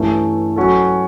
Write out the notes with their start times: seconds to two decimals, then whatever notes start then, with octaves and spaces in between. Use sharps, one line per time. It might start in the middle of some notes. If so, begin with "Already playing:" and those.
Already playing: G2 E3 A3 C#4 E4
0.56 F#3 C#4 F#4 A4